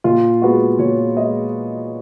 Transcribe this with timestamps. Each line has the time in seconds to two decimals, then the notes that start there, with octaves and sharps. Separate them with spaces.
0.04 A#2 F4
0.42 G#3 B3 F#4
0.79 A#2 C#5
1.16 G#3 D#5